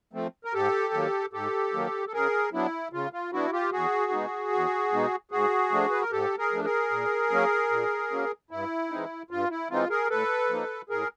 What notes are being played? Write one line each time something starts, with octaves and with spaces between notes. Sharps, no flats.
F3 A3 C4
A#4
G#2 G4 A4
D#3 F#3 A#3
G#2 G4 A4
D#3 F#3 A#3
A4
C#3 G#4 A#4
F#3 B3 D4 E4
C#3 F4
F4
F#3 B3 D4 E4 F#4
F4 G4
E2 F#4 G#4
B2 G#3 B3 D#4
E2
B2 G#3 B3 D#4
G#2 F#4 G#4
F3 A3 D4
B4
A#4
G#2 G4 A4
G#4 A#4
F3 A3 D4
G#4 A#4
A#2
F#3 A#3 C#4
A#2
F#3 A#3 C#4
G2 E4
E3 G#3 C4 D#4
G2 F4
E4
E3 G#3 C4 D#4 F4
G#4 A#4
A2 A4 B4
F3 A#3 D#4
A2 G#4 A#4